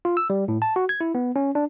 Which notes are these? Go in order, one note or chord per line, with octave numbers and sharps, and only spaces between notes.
F4
E6
G3
A2
A5
F#4
G#6
E4
B3
C#4
D4